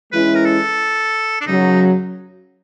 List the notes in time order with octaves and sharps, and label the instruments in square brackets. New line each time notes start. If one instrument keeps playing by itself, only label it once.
[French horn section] E3 G#3 C#4 E4 [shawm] B4
[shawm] A#4
A4
D4
[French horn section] F#2 C#3 F#3 [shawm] D#4